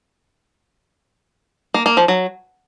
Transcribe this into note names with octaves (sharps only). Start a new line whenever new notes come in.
A#3
A#3
F3
F#3